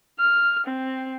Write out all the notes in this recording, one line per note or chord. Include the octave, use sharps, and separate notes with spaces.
F6
C4